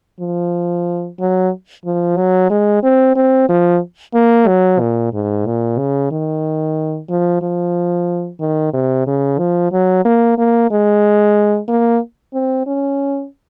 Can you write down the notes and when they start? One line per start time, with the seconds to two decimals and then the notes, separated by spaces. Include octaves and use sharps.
0.20 F3
1.20 F#3
1.85 F3
2.17 F#3
2.50 G#3
2.83 C4
3.16 C4
3.49 F3
4.14 A#3
4.47 F#3
4.80 A#2
5.13 G#2
5.46 A#2
5.78 C#3
6.11 D#3
7.09 F3
7.42 F3
8.40 D#3
8.73 C3
9.07 C#3
9.38 F3
9.72 F#3
10.05 A#3
10.38 A#3
10.71 G#3
11.68 A#3
12.34 C4
12.66 C#4